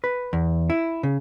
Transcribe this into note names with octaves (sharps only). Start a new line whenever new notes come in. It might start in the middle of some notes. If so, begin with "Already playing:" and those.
B4
E2
E4
C#3